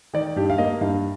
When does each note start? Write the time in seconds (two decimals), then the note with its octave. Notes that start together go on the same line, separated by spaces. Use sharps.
0.14 D#3 D5
0.36 G2 G4
0.50 F5
0.58 A#3 D#5
0.81 G2 F5